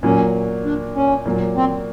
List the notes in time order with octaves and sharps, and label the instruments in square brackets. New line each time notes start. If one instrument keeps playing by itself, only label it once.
[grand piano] A#2 F#3 A#3 [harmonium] C#4
[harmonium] D4
C#4
[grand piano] A#2 F#3 A#3
[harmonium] C4